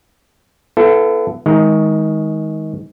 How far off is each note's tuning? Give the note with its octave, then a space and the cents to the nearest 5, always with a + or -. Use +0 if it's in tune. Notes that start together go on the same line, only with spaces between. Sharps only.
B3 +10 E4 +45 A4 +0
D#3 +25 G#3 +0 A#5 +0